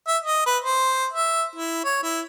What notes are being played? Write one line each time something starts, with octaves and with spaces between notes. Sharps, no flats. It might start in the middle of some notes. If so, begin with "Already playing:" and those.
E5
D#5
B4
C5
E5
E4
C#5
E4